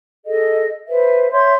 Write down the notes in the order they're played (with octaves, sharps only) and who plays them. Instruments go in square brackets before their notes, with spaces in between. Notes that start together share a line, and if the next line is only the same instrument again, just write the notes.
[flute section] G#4 A4 D#5
B4 C5 E5
C#5 E5 C6 G6